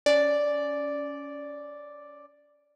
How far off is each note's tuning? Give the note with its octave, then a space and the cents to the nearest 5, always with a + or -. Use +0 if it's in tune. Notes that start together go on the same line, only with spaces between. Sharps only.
C#4 +20 D5 +0